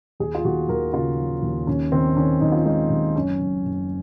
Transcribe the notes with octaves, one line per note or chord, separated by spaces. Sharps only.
D#2 G#4
F4
D#2 F#4
D#2 A#4
C#3 F4
F3
D#2
D#2 C#4
D#3 C4
D#3 C#4
D#2 D#4
F4
G#3 D#4
D#2
F#1 C#4
F#1
F#1